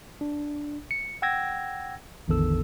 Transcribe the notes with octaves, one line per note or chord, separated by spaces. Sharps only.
D4
C#7
F#5 G5 E6 G#6 A#6
A1 E2 D3 D#3 A4 E6